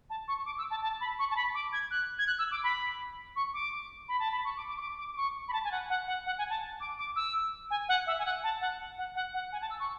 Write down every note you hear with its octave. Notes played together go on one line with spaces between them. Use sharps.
A5
C#6
D6
E6
A5
A5
B5
C#6
A5
B5
D6
G#6
F#6
G#6
F#6
E6
D6
B5
C#6
D6
B5
A5
B5
C#6
D6
D6
C#6
D6
D6
D6
C#6
B5
A5
G#5
F#5
F#5
F#5
F#5
G#5
A5
D6
D6
E6
G#5
F#5
E5
G#5
F#5
A5
F#5
F#5
F#5
F#5
G#5
A5
E6
C#6